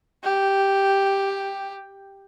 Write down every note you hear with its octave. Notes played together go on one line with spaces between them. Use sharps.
G4